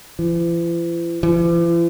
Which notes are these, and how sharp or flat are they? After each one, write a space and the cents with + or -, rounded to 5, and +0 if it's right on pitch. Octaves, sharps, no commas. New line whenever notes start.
E3 +45
E3 +45